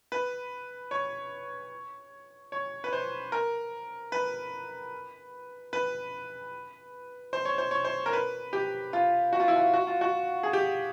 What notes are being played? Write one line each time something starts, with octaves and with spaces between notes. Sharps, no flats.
B4
C#5
C#5
B4
C5
A#4
B4
B4
C5
C#5
C5
C#5
C5
A#4
B4
G4
F4
F#4
F4
E4
F4
F#4
F4
F#4
G#4
G4